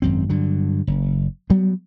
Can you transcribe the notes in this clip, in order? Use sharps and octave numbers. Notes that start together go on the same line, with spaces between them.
G#1 F#2 C4
G2 D3 F#3
F#1
F#3 G3 B3